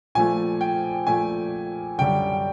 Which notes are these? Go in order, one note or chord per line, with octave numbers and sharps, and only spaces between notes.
A#2 F3 A3 G#5
G5
A#2 F3 A3 G#5
F#2 D3 G3 G5